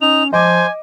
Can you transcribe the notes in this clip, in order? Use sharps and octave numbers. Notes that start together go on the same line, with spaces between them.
C#4 D#4 F7
F3 C5 D#5 G#5 D6